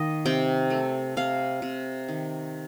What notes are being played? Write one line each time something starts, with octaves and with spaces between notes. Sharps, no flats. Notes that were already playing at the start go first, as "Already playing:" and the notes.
Already playing: D#3 A#3 D#5
C3 G5
A3
C3 F5
C3
D#3